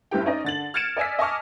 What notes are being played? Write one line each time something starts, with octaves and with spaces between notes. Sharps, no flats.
F#1 G2 E4 G4 G5
C#4 D#4 D5 D#5
D3 A6 F#7
F6 G#6 A6 C#7 D7 E7
D5 D#5 G#5 E6 B6
D#5 G#5 A5 C#6 D6 F6